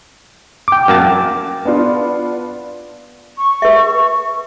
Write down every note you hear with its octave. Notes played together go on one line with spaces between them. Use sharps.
G5 D6
F#2 A#3 A5
B3 D4 F4
C#6
B4 E5